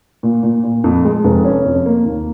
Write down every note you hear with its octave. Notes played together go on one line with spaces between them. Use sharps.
A#2
A#2
A#2
F2
G#3
F1
C#4
F2
A#3
D#2